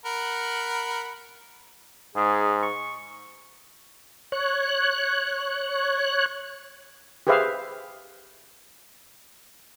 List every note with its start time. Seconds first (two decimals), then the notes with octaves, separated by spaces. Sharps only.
0.06 A#4 F#5 B5
2.15 G#2 G#4
2.62 C#6
4.32 C#5 F#6
7.27 G4 G#4 B4 C5 E5 F5